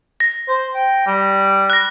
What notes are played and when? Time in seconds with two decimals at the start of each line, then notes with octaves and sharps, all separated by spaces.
0.20 A#6
0.48 C5
0.75 G5
1.07 G3
1.70 F#6 A#6